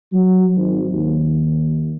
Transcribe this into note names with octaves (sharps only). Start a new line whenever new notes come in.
F#3
G#1
D#2